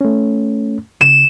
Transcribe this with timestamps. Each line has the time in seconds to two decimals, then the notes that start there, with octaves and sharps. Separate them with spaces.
0.01 A3 C#4
1.01 C#3 E7